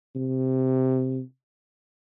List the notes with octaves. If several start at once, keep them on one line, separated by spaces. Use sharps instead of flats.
C3